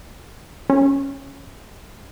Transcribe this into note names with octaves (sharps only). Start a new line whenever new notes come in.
C#4